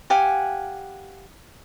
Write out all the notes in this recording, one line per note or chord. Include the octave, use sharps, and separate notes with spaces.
G4 F5 F#5 G#5